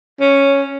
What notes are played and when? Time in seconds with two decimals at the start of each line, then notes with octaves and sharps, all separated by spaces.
0.20 C#4